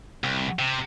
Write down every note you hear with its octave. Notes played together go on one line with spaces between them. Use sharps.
C2
C3